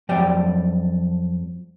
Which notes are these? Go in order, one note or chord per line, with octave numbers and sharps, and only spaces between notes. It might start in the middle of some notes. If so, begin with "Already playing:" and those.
F2 F#3 D5 G5